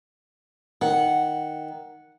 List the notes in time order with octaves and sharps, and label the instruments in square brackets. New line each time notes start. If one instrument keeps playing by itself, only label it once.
[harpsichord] D#3 [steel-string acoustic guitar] F#5